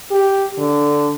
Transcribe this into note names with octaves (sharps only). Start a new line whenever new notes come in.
G4
D3